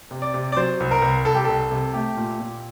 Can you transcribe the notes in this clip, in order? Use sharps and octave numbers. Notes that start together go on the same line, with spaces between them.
C3
D5
C3
D5
F#3 C5
C2
A#4
C2
C2 A4
G4
C2 A4
C3
A3 G4
A#2
A#2